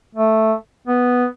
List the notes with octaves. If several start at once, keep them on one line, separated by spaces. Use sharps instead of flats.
A3
B3